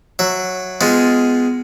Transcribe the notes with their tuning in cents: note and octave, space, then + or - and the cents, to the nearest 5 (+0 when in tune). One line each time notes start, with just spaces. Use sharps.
F#3 -5 E5 +0
G#3 +0 B3 +20 F4 +0